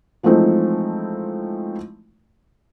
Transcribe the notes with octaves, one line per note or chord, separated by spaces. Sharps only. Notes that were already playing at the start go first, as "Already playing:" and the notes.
E3 F3 G#3 A3 C4 D#4